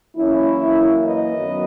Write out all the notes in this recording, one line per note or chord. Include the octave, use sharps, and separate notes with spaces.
F#2 E3 A#3 C#4 E4
B4 D#5
F#2 D#3 F#3 B3